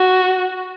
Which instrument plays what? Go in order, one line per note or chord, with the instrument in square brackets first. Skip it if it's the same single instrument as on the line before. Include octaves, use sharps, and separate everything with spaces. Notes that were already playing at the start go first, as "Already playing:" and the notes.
Already playing: [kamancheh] F#4